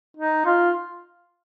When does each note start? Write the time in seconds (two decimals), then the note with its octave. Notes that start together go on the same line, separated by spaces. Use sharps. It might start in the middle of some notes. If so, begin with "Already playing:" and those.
0.17 D#4
0.45 F4